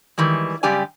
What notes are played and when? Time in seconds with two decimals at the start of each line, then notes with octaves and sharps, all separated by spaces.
0.18 D#3 E3 G3 G#3
0.63 F#2 C#3 G3 G4 D5 G#5